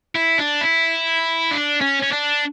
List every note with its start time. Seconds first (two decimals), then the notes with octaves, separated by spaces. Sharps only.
0.15 E4
0.38 D4
0.61 E4
1.51 D4
1.81 C#4
2.03 C#4
2.12 D4